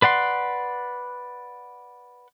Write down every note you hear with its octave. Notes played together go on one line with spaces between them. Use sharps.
B4 D5 F#5 C6